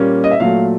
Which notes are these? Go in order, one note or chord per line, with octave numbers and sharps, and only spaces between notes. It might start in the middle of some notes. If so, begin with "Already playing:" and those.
Already playing: A#2 G3 A#3 C#4
D#5
E5
A#2 F#3 A3 F5